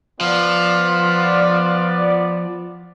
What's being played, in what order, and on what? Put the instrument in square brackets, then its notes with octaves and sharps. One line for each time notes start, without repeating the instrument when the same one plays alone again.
[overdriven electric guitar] F3 [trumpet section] B3 D5 [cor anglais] F4